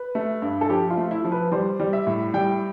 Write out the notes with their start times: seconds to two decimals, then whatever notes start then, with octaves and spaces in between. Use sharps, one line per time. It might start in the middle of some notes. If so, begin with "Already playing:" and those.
Already playing: B4
0.15 A3
0.42 G2
0.61 A4
0.70 F3 G4
0.90 F4
0.97 A3
1.11 E4
1.24 F3
1.32 B4
1.52 G3 C5
1.80 G3
1.93 E5
2.07 A2
2.34 G3 G5